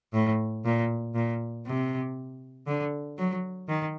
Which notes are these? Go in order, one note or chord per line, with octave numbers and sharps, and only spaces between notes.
A2
A#2
A#2
C3
D3
F#3
D#3